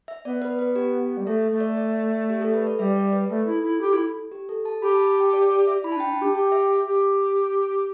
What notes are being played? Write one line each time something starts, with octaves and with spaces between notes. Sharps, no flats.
E5
B3 D5
B4
B4
G4
G3
A3 A4
A3
D5
D5
G4
A4
B4
D5
G3 E5
D5
B4
A3 A4
E4
E4
G4
E4
G4
A4
A5
G4 B5
A5
A5
G5
D5
D5
E5
E4 B5
A5
D4 G5
D4 A5
G4
G4 G5
E5
G4